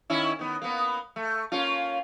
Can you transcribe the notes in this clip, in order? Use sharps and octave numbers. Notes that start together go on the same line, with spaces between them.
D#3 C#4 E4
D#3 B3
A#3 B3
A3
A#3 C#4 F4